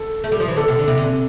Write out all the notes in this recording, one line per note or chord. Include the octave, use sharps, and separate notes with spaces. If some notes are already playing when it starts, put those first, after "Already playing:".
Already playing: A4
A3
G3
F3
E3
D3 A4
C3
D3
C3
D3